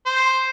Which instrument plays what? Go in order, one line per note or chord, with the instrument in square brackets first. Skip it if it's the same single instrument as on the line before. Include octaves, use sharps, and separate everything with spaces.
[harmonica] C5